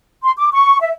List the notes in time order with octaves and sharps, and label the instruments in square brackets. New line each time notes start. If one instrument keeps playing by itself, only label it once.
[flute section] C6
D6
C#6
E5